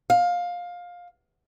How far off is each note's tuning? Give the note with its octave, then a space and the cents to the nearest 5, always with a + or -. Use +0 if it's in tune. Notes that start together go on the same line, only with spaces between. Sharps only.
F5 +15